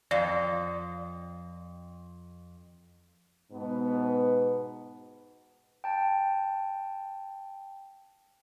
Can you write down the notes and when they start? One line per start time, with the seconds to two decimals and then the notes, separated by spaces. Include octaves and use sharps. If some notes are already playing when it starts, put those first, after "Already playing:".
0.11 F2 D5
3.51 G#2 B2 B3
5.84 G5 A5